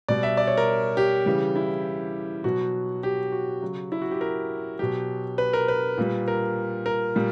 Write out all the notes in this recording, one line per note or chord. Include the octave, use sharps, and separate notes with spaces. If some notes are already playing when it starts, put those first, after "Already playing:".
B2 G3 D5
E5
D5
C#5
A#4
G4
C#3 E3 G3
E4
B2 F#3 F#4
G4
F#4
C#3 F#3
E4
F#4
G4
A#4
B2 F#3 G4
B4
A#4
B4
A#2 G3
A#4
A#4
A#2 G3